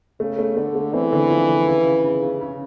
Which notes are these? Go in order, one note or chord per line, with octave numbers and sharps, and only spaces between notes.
C#3 A3
A3
D3 A3
A3
E3 C4
D3
F3
D3
C#3
C#3
C#3
C#3
C#3